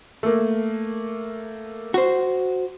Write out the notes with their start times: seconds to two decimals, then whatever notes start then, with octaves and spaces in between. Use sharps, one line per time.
0.23 A3 A#3
1.94 F#4 C5